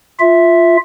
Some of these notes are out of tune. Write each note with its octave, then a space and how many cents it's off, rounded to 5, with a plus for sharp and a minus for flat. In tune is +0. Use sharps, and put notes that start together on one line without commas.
F4 +0 E5 +0